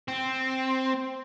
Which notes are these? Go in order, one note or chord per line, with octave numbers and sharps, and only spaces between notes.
C4